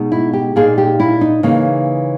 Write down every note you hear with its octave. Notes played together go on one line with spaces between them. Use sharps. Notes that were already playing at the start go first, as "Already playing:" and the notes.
Already playing: B2 G#3 D#4
E4
G4
A#2 A#3 D#4 G#4
G4
E4
D#4
C#3 E3 A#3 D#4